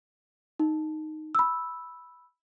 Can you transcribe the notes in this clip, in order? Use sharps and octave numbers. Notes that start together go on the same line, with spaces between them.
D#4
B5 E6